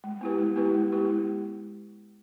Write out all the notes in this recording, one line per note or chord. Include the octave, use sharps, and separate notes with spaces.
G#3
B3 E4 G4 B4
G#3
B3 E4 G4 B4
G#3
B3 E4 G4 B4
G#3